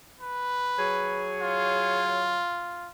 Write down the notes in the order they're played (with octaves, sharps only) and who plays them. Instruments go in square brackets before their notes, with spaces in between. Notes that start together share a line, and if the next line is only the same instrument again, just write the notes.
[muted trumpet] B4
[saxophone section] F#3 G#4 C#5
[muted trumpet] F4